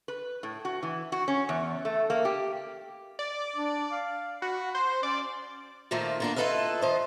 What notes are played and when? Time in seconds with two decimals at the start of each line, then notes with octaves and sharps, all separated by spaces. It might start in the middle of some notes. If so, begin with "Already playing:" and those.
0.08 B4
0.43 A2
0.65 F#4
0.83 E3
1.12 F#4
1.28 C#4
1.49 E2
1.85 A3
2.10 A#3
2.25 G4
3.19 D5
3.56 D4
3.92 F5
4.42 F#4 B5
4.75 C5 C6
5.03 C#4 D5
5.91 A#2 D#3 F3 A3 A#3
6.20 D3 A#3 D4
6.36 E4 F4 A4 B4 D#5 F5
6.81 D#3 C5 D#5